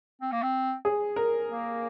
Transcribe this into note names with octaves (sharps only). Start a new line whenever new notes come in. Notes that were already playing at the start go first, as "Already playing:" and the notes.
C4
A#3
C4
G#4
A#4
A#3